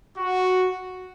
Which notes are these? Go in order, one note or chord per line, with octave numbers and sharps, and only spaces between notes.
F#4